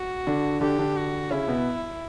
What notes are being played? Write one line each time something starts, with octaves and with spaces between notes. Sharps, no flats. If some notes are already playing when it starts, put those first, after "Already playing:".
Already playing: F#4
D3 D4
D3 D4 G4
D3 D4
F#4
C#3 C#4 E4
B2 B3